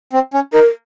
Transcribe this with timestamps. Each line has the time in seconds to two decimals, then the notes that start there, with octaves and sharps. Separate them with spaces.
0.13 C4
0.34 C#4
0.53 D#4 A#4